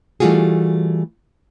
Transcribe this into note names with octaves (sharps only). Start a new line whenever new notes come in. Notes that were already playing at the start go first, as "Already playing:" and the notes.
E3 G3 A3 F4 F#4 G#4